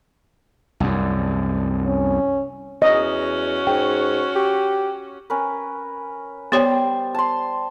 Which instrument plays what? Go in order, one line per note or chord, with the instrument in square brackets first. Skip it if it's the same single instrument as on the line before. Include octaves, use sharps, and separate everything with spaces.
[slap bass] C2 F#2
[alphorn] C#4
[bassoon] E2 [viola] C#4 F#4 [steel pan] D#5
[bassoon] G#2 [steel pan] G5
[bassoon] G4
[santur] C#4 A#4 B4
[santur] G3 C5 [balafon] B3 G4 C#5
[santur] A5 C6